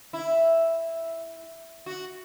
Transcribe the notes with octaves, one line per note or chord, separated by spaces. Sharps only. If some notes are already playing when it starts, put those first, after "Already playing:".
E4
F#4